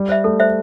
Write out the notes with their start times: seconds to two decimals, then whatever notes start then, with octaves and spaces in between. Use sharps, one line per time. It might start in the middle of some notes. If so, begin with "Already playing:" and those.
Already playing: G3
0.09 C5 E5
0.24 A3 A4
0.40 C5 E5